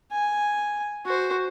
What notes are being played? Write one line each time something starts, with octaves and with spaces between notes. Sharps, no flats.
G#5
F#4 C5